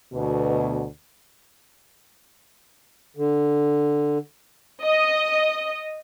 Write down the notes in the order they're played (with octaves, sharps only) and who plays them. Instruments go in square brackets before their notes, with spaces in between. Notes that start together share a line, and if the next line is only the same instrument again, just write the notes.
[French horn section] D2 B2
[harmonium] D3
[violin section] D#5